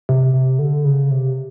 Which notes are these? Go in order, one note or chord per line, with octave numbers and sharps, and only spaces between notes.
C3
C3
D3
C#3
C3